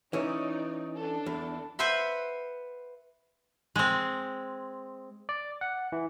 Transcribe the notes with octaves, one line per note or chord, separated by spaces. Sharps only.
E3 C#4 D#4 C#5 D5
D4 A4
E2
B4 C5 E5 F#5 B5
G#3 C4
D5
F#5
E3